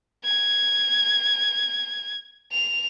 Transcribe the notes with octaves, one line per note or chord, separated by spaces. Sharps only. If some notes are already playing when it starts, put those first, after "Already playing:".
G#6
F7